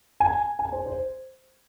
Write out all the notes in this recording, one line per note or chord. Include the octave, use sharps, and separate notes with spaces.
G#5
G#5
C5
C5